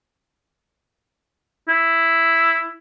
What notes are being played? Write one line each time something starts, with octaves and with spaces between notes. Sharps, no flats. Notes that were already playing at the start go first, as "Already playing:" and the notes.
E4